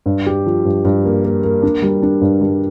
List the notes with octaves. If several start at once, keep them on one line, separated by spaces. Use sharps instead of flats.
G2
G4
F3
G2
G2
A#3
A#3
A#3
D4
G3
D4
G2
G3